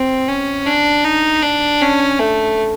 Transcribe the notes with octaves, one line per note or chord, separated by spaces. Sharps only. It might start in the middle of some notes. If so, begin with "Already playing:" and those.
Already playing: C4
C#4
D4
D#4
D4
C#4
A3